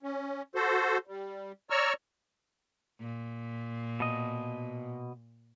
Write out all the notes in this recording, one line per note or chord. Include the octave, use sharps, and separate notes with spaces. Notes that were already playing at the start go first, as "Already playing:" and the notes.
C#4
F#4 A4 C5
G3
C#5 D5 A#5 C#6 E6 F6
A#2
B2 D#5